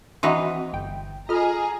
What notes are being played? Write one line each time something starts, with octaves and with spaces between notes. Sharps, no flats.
E3 C4 D#4 F#4 B4 F#5 B5 C6
G1 G5
F4 G#4 A4 D#5 A#5 F6